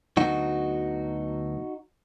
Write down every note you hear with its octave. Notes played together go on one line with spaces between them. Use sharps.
D2 D3 F#3 B3 D#4 F#4